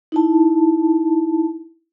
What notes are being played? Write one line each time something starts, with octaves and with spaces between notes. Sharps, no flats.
D#4 E4 A5